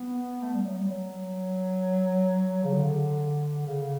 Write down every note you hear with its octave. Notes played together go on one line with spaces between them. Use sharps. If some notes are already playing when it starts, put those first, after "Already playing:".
Already playing: B3
A3
G3
F#3
G3
F#3
C#3
D3
C#3